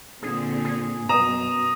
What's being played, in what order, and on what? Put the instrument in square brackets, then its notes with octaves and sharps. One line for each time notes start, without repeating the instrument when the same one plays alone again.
[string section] A#2 D3 C4 [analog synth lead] G#4
[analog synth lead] G#4
[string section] F#2 [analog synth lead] B2 [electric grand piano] A#5 [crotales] D#6 D#7 E7